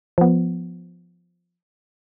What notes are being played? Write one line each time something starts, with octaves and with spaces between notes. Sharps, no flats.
F3 B3